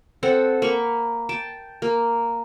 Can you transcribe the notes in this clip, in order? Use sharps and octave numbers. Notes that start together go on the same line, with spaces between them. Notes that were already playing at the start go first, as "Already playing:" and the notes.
C4 A4 F#5
A#3 B5 C#6
G5 A5
A#3